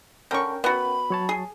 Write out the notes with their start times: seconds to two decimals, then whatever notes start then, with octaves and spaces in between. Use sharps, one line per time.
0.31 D3 C#4 A#4 G5 C#6
0.64 B3 F#4 B5
1.10 F#3 C#5 A5
1.29 G#4